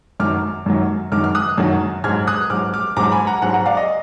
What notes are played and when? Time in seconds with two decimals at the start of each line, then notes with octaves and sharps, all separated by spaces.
0.20 F#2 D#3 F#3 D6 F6
0.66 F#2 D#3 F#3
1.12 F#2 D#3 F#3 D6 F6
1.24 F6
1.35 D#6 F#6
1.58 F#2 D#3 F#3
2.04 G#2 F#3 F6 G#6
2.27 D#6 F#6
2.50 G#2 F#3 D6 F6
2.74 D6 F6
2.97 G#2 F#3 A#5 D6
3.12 G#5 B5
3.27 F#5 A#5
3.42 G#2 F#3 F#5 A#5
3.54 F#5 A#5
3.66 D5 F5
3.77 D#5